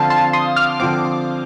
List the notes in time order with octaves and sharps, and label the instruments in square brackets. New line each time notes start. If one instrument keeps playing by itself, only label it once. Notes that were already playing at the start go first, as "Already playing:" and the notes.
Already playing: [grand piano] D3 F3 C4 [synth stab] F5 A5
[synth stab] A5 C6
C6 D#6
D6 F6
[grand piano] D3 F3 C4 [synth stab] D6 F6